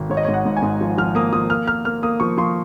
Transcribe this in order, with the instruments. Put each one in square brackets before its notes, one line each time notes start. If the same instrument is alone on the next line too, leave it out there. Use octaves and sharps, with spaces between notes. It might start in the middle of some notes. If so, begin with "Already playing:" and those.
Already playing: [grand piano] G#1
G#2 C#5
D#5
C#5
G#2
F#5
G#2
G#5
G#2
F3
F3 F6
A#3 D#6
F3 D#6
A#3 F6
A#3 F6
A#3 F6
A#3 D#6
F3 C#6
F3 C6